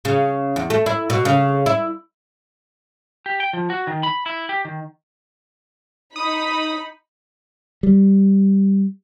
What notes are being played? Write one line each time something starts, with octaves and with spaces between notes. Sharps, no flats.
C#3
E2
A3
E4
B2
C#3
E4
G4
G5
F3
F#4
D#3
B5
E4
G4
D#3
D#4 B5 D#6
G3